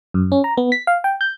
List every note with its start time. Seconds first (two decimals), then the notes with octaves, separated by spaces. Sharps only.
0.14 F#2
0.32 C#4
0.44 A#5
0.57 B3
0.72 B6
0.87 F5
1.04 G5
1.21 G6